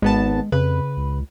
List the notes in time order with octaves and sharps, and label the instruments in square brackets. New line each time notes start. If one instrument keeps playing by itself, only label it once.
[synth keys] G#1 B3 A5 [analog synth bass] G#3
[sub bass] F2 [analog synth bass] C#3 [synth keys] B4
[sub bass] C#2